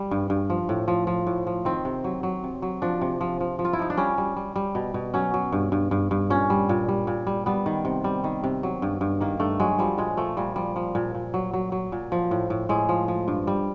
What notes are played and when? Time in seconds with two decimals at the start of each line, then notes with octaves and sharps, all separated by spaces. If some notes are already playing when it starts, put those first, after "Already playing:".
Already playing: G3
0.11 G2
0.30 G2
0.50 F3
0.69 A2
0.88 F3
1.07 F3
1.27 A2
1.47 F3
1.65 D#3 C4
1.85 C3
2.04 F#3
2.23 F#3
2.44 C3
2.62 F#3
2.82 F3 D4
3.02 C3
3.21 F3
3.41 F3
3.59 F3
3.65 F4
3.73 E4
3.79 F3 D#4
3.90 D4
3.97 G3 C#4
4.18 G3
4.36 G3
4.56 G3
4.75 B2
4.94 B2
5.14 F#3 C#4
5.34 F#3
5.52 G2
5.72 G2
5.91 G2
6.11 G2
6.30 A#2 C#4
6.50 G3
6.69 A#2
6.88 G3
7.07 A#2
7.27 G3
7.46 G3 B3
7.66 D#3
7.85 C3
8.04 G3
8.24 D#3
8.44 C3
8.63 F#3
8.82 G2
9.01 G2
9.21 D#3 A#3
9.40 G2 A3
9.60 F#3 G#3
9.78 F3 G3
9.98 A#2 G#3
10.17 F3 A3
10.37 A#2 G3
10.56 F3 G3
10.76 F3
10.95 A#2
11.15 A#2
11.34 F#3
11.53 F#3
11.72 F#3
11.92 A#2
12.12 F3
12.31 A2
12.50 A2
12.69 A2 G#3
12.89 F3
13.08 F3
13.28 G2
13.47 G3